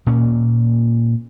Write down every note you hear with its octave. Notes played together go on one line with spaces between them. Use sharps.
A#2 A#3 C#4